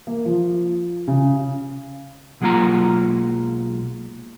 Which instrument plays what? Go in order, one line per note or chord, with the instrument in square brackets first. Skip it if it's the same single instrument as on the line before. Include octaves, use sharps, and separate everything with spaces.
[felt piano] A#3
F3
C#3
[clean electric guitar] B1 F#3 G#3 A#3 F4 A#5